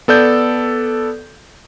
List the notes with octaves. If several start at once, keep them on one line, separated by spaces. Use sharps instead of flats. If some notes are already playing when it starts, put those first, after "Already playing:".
B3 A4 D5 G6